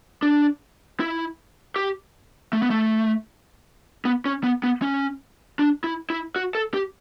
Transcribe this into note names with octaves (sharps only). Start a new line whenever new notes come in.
D4
E4
G4
A3
B3
A3
B3
C#4
B3
B3
C#4
D4
E4
E4
F#4
A4
G4